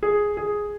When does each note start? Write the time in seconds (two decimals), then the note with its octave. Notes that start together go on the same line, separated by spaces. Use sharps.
0.03 G#4
0.37 G#4